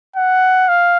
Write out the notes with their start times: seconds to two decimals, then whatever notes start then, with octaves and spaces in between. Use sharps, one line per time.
0.16 F#5
0.69 F5